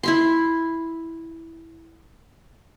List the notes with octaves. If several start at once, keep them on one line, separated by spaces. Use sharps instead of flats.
E4 E5 C6